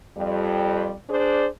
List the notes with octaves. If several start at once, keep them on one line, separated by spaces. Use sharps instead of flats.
F2 G3
D4 G#4 C5 D5